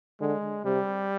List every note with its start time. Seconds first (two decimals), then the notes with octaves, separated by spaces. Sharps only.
0.20 D3 G#3
0.65 C3 G3